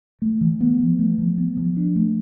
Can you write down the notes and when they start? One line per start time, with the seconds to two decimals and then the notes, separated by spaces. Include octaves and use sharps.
0.22 A3
0.41 E3
0.61 B3
0.80 F3
0.99 A3
1.18 F3
1.38 B3
1.57 F3
1.77 D4
1.96 A3